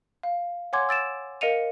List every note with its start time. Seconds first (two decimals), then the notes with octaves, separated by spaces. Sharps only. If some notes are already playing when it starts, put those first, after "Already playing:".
0.23 F5
0.73 C#5 F#5 G#5 C6 D6 G#6
0.89 E6 A6 D7 E7
1.41 A#4 D#5 F5 C#7 D#7 F7